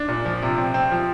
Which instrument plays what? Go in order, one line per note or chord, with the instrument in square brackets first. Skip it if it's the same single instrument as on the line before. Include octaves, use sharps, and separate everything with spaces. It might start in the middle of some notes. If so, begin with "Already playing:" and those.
Already playing: [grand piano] D4
A#2
F3
C3
C4
C4
F3